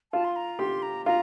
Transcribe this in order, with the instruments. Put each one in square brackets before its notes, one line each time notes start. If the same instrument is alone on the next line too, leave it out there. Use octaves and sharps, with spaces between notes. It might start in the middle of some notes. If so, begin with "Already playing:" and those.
[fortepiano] F4 [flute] A5
[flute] C6
A#5
[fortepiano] G4 [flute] C6
[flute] A#5
[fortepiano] F4 [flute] A#5